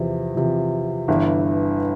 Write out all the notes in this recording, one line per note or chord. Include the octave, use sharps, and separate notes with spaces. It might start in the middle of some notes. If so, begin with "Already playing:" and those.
Already playing: E2 C3 F3
E2 C3 F3
G1 G2 E3